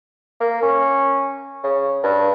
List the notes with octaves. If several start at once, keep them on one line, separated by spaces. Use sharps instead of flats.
A#3
C#4
C#3
G2